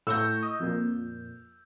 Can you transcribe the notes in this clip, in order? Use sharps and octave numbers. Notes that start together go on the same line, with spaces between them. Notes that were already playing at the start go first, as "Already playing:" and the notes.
A2 C#6 E6 G6 A#6
D#5
F2 A#2